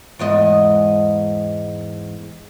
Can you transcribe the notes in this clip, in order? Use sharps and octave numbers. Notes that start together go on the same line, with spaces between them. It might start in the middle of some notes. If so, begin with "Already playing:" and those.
E2 G#2 D#5